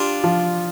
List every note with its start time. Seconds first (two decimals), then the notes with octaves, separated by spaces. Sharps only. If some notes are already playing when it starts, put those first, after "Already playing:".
Already playing: D4 F4 G4
0.24 F3